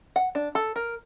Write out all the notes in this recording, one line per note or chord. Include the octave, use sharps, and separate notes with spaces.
F#5
D4
A4
A#4